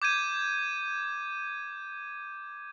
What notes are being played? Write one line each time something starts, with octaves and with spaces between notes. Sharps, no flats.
D6 G6 G#6 D#7